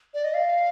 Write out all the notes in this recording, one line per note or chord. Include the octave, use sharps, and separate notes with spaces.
D5
D#5
F5